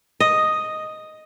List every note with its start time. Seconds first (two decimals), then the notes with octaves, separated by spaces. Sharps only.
0.20 D#5